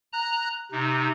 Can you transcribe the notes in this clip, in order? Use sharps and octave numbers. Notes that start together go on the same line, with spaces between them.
A#5 F#6
C3 D#4